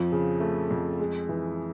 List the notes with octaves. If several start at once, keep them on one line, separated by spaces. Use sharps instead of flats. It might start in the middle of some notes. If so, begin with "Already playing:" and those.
Already playing: F2 F3
C#3
A3
F2
G#3
E3